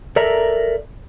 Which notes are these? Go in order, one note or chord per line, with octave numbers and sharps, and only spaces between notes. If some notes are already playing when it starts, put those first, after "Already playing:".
A4 A#4 D5 E5 A#5